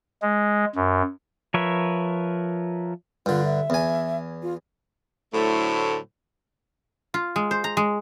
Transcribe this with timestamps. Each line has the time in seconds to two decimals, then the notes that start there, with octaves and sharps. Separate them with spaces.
0.22 G#3
0.75 F#2
1.54 F3 A#4 B4 C#5 E5
3.26 G2 D3 F4
3.45 E5
3.70 E2 G#5
4.42 F4
5.33 A2 D3 F#3 A3 E4 C5
7.14 F4
7.36 G#3
7.51 C5
7.64 A#5
7.77 G#3